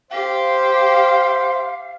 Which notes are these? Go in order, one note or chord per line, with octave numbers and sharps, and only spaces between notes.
G4 C5 F5